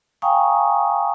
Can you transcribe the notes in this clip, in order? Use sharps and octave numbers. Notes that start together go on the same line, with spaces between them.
F5 G5 G#5 A#5 C#6 D#6